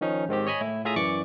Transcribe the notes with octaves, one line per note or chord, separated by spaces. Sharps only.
D#3 F3 C#4 D#4
G#2 D#3 C4 G4
C#5 D#5 G#5 B5
A2 E4
A2 F4 G#4 E5 A#5 D#6
F#2 E3 D5 C#6 D6 C#7